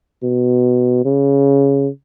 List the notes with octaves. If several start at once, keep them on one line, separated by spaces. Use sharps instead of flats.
B2
C#3